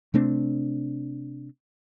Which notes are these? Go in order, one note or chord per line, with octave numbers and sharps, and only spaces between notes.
C3 A3 C4 D4